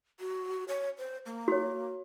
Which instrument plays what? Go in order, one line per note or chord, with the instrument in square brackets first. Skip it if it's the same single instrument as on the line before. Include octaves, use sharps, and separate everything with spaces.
[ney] F#4
C#5
C5
A#3
[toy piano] F#4 C#5